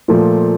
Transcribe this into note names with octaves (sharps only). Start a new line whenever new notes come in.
A#2 F3 A3